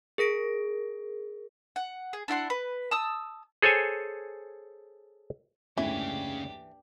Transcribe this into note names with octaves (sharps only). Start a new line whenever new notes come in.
G#4 A#4 A#6 D7
F#5
G#4
D4 E4 F#5 C6
B4
A5 D#6 E6
G#4 A4 C5 C#5 G#5
F#1 D2 G#2 C#3 E3 C#4 D4 G4